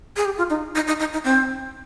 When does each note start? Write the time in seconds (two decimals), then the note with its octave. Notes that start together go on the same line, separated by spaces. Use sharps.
0.17 G#4
0.25 G4
0.38 F4
0.50 D#4
0.75 D#4
0.87 D#4
1.00 D#4
1.13 D#4
1.24 C4